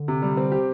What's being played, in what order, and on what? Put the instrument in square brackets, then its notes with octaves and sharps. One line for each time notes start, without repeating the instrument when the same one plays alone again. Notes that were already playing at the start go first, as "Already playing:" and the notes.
Already playing: [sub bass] D3
[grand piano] C3
G3
C4
G4